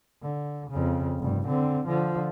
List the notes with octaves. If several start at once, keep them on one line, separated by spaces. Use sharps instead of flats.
D3
F2 C#3
F1 G2
D3 C4
D3 F3